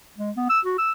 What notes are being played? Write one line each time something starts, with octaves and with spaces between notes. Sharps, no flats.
G#3
B3
E6
F#4
E6